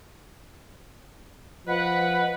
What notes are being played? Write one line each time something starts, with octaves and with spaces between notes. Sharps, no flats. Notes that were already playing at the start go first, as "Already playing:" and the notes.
F3 B4 D#5 F#5